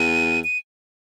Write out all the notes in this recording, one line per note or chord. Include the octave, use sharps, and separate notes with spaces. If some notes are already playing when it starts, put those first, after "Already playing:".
Already playing: E2 D#7
D#7